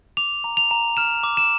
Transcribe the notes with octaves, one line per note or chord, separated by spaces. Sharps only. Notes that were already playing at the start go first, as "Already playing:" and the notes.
D6 F7
A#5
F7
A#5
F6 E7
D6
E7